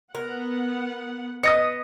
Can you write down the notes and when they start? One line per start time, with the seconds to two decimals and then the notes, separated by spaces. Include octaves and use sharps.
0.15 B3 A#4 F#5
1.43 B3 D#5 D#6 A#6 C#7